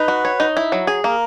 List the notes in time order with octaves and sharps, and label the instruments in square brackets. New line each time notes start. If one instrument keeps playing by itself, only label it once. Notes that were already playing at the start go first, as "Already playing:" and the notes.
Already playing: [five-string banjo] D#4 [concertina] B4
[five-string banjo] F#4
C#5
D#4
E4
F#3
G#4
[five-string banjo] A#3 [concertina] A#4